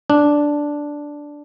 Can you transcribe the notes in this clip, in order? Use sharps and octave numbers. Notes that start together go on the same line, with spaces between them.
D4